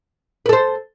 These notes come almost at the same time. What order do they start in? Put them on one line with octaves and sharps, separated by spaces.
B4 A4 C5